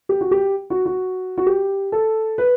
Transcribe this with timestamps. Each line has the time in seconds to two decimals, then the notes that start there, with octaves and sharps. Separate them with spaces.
0.09 G4
0.21 F#4
0.31 G4
0.70 F#4
0.86 F#4
1.38 F#4
1.46 G4
1.92 A4
2.38 B4